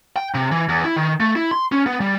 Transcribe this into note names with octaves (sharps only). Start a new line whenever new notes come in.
G5
C3
E3
E2
E4
D#3
A3
E4
C6
C#4
B3
G3